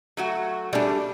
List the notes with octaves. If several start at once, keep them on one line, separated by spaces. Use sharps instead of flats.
F#3 A3 F#4
G3 A3 D4 G#4